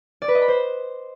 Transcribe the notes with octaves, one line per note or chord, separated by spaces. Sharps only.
D5
B4
D#5
B5
C5